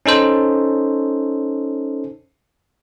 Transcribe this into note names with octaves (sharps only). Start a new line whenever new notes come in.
C#4 D#4 A4 C5